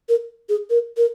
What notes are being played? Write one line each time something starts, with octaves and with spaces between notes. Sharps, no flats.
A#4
G#4
A#4
A#4